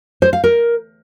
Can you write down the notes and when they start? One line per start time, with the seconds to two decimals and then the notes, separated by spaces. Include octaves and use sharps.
0.22 C5
0.33 F5
0.44 A#4